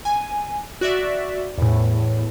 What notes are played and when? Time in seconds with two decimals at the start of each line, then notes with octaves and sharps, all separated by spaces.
0.05 G#5
0.81 F#4 D5 E5
1.58 E2 A2